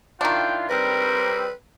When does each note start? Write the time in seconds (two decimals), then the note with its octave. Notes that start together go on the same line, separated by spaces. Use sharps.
0.21 D#3 D4 E4 F4 G5
0.70 G3 C4 A#4 B4